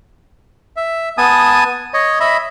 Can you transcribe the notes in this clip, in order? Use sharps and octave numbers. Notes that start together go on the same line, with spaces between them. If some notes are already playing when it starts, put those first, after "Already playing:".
E5
B3 G#5 A5 D#6
C#5 D#5
D#5 E5 B5